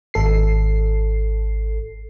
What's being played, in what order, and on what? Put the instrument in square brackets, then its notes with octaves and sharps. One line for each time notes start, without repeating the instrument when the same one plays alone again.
[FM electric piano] G#1 A4 C7